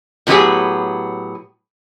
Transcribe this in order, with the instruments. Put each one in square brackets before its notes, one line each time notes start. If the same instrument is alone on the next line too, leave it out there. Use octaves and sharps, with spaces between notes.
[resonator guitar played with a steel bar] A2 C3 F#3 B3 G4 G#4